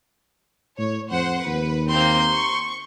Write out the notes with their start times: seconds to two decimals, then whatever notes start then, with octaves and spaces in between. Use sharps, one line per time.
0.78 A2 C#5
1.11 F2 C5 F#5
1.46 D#2 B4
1.89 A#3 C4 C6 G6
2.33 C#6